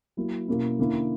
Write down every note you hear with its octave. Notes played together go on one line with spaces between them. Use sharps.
F#3 A#3 E4
B2 A#3 C#4 E4
D3 A#3 C#4 E4